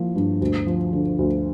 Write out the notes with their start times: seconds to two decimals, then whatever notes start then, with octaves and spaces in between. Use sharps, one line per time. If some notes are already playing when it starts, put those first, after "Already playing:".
Already playing: F3 A#3 E4
0.15 G2
0.41 D2
0.67 F3
0.93 D3
1.19 D2